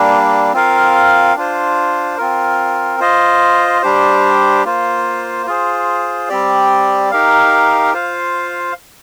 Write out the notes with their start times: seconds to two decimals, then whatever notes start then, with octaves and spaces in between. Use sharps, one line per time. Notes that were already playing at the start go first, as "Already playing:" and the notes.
Already playing: G3 A#3 D4
0.53 C4 F4 A#4 F5
1.35 D4 F4 C5
2.17 C4 F4 A#4
3.00 F4 C5 D#5
3.82 G3 D4 G4 C5
4.65 A#3 F4 C5
5.46 F4 G#4 C5
6.29 G3 C4 G4 D5
7.11 D#4 G4 A#4 F5
7.93 F4 C5 F5